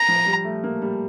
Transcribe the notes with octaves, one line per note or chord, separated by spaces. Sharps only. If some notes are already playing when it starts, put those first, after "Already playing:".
Already playing: A#5
F3
G3
A3
A#3
G3